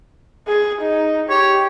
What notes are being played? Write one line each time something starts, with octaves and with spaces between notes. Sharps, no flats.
G#4
D#4
G4 C#5